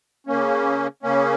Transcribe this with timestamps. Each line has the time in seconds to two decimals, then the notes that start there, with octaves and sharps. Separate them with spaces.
0.27 C#3 A#3 C#4
1.03 C#3 A#3 C#4